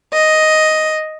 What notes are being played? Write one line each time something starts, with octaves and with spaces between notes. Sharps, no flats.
D#5